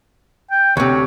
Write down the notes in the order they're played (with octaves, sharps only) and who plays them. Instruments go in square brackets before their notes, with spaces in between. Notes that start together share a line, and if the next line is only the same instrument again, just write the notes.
[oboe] G5
[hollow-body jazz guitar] D2 C3 [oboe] C#5